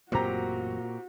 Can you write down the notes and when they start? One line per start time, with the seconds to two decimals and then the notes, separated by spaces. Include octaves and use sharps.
0.12 A1 F#2 A#2 F#3 C4 F#4 G4 A#5